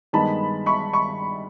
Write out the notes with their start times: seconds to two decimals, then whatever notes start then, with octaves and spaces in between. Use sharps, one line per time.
0.13 G2 D#3 G#3 B3 A5 B5
0.66 B5 C#6
0.93 B5 C#6